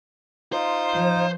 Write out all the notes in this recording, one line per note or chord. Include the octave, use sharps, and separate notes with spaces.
D#4 F4 C5
F3